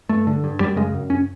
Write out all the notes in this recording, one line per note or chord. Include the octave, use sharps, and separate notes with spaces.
G2 A3
D3
G2
F#2 G3
C#3 G#3
F#2
C#4